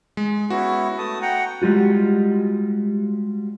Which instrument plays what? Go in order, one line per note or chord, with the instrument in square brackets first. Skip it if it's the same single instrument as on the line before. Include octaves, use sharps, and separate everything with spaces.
[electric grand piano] G#3
[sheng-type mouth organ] B3 C#4 E4 [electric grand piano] F#4
[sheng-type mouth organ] A3 A5 D#6
F#5 G5 A#5
[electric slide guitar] G3 G#3 F4 F#4